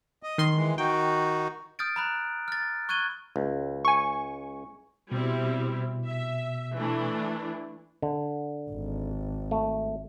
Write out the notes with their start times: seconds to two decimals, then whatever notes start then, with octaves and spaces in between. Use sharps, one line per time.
0.23 D#5
0.38 D#3 C6
0.56 E3 G#3
0.78 D#3 D#4 F#4 G5
1.79 D#6 F6 G6 A6 D7
1.96 A#5 B5 F#6
2.48 F6 A6
2.89 C#6 F#6 G#6 D#7 G7
3.36 C#2
3.85 G#5 C#6
5.12 B2 G3 C4 E4
6.06 E5
6.77 E3 A3 D4
8.02 D3
8.70 G#1
9.51 A3